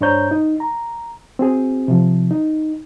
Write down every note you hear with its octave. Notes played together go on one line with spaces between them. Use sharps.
G2 D4 C5 C#5 A#5 G6
D#4
A#5
C4 F#4 G#4
C3 F3
D#4